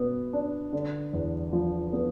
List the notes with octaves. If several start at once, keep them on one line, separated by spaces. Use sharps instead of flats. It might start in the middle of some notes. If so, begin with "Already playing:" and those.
Already playing: B2 B3
D4
D3
E2
F3
B3